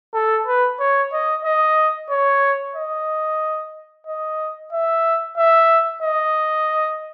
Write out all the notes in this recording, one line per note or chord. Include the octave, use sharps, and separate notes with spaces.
A4
B4
C#5
D#5
D#5
C#5
D#5
D#5
E5
E5
D#5